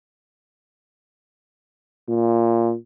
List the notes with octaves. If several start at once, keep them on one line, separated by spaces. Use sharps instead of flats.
A#2